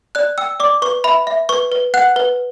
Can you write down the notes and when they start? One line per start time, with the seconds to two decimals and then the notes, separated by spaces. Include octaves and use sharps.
0.15 D5 F#6
0.38 G5 E6
0.60 D5 D6
0.82 B4 C#6
1.04 E5 B5
1.27 E5
1.49 B4 C#6
1.72 B4
1.94 F#5 F#6
2.16 B4